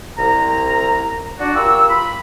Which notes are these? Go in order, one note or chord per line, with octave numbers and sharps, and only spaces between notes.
C2 A#5
D4 F#4 D5
F4 G4 A#4 E6
B5